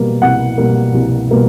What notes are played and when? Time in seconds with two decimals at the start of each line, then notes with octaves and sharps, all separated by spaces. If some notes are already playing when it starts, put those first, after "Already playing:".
Already playing: B2 G3 A#3
0.22 C2 F#5
0.58 B2 G3 A#3
0.94 C2
1.31 B2 G3 A#3